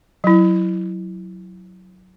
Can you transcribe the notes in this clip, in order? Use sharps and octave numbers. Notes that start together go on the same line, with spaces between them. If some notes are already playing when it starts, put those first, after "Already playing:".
F#3 E4